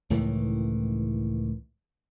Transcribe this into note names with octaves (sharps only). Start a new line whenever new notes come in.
C#2 A2 D#3 E3